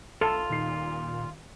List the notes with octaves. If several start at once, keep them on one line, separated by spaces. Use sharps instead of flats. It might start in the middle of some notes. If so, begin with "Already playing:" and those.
B1 F4 A4
D#1 A#2 D#4 C7